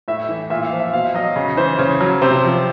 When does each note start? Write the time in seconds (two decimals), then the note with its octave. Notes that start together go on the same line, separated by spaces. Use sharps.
0.08 A2 E5
0.29 E3
0.50 A#2 E5
0.65 F5
0.72 F3
0.79 E5
0.93 B2 F5
1.14 F#3 D#5
1.36 C#3
1.57 E3 C5
1.79 C#3 C#5
2.01 F#3
2.21 C3 C5
2.43 F3